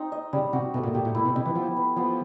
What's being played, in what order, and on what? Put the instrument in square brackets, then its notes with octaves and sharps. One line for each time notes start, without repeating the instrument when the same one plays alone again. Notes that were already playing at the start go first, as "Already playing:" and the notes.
Already playing: [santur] C4 D#4
D#5
[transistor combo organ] C#3 [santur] G3
[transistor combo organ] C3 [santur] F#4
[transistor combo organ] B2 [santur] A3
[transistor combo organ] A#2
[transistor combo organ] A#2 [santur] G4
[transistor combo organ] A2
[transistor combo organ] A#2 [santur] E4
[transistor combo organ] B2
[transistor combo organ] C3 [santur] D#5
[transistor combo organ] E3
[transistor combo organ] F3 [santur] B3
[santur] B4
[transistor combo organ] F3 [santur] B3